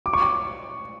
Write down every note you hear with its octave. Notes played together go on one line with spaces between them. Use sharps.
D6
C#6
D6